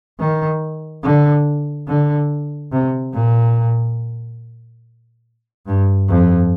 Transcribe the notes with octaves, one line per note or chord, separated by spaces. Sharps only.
D#3
D3
D3
C3
A#2
G2
F2